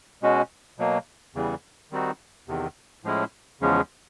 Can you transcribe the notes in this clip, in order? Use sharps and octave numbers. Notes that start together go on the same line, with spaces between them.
B2 G#3 C#4 F#4
B2 F#3 A#3
E2 C#3 E3 G3
D#3 G3 C4 D#4 F#4
E2 C3 D#3
A2 F3 G#3 C#4 E4
E2 C#3 F3 G#3 C#4